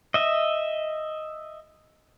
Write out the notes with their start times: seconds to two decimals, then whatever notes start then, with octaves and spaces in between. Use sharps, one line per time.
0.14 D#5 E5